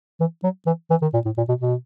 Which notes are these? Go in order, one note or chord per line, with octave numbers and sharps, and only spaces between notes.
E3
F#3
E3
E3
D#3
A#2
A2
A#2
B2
B2